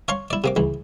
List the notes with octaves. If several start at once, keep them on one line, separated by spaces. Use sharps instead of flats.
C#5 F5 A#5 C6 C#6
E4 D5
C3 A#3 D6
C#2 E3